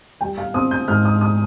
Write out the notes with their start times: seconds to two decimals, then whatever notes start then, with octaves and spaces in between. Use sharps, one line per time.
0.21 G3 G5
0.38 F5
0.54 C4 D#6
0.71 G6
0.88 G#2 F6
1.05 D#6
1.21 D#6